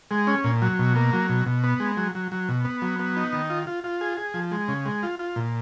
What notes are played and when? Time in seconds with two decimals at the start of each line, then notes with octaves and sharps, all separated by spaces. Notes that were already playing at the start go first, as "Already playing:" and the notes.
0.11 G#3
0.27 C#4
0.44 A#2
0.62 F#3
0.79 B2
0.95 A#3
1.13 F#3
1.29 B2
1.46 B2
1.64 B3
1.80 G#3
1.97 F#3
2.15 F#3
2.32 F#3
2.49 B2
2.65 B3
2.82 F#3
3.00 B3
3.16 D#4
3.33 D#3
3.50 F4
3.67 F4
3.84 F4
4.01 G#4
4.17 G#4
4.34 F3
4.51 G#3
4.68 C#3
4.86 G#3
5.03 F4
5.19 F4
5.36 A#2